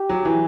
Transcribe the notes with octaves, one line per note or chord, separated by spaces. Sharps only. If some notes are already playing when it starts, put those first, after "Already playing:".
Already playing: G4
F#3
E3